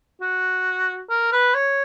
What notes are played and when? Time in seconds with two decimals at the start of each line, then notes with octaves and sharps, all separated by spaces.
0.22 F#4
1.10 A#4
1.32 B4
1.55 C#5